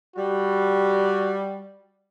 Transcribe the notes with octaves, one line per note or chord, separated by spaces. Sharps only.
G3 F#4